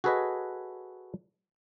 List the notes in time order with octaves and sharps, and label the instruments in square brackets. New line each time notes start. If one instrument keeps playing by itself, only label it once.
[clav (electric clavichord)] F#4 G#4 A4 B4 C#5 D#5